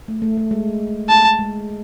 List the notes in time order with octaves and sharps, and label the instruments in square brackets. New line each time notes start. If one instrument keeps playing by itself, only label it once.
[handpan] A3
A3
A3
G#3
[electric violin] A5
[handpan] G#3